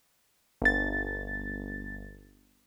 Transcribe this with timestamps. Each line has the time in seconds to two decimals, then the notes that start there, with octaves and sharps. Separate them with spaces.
0.62 G1 A6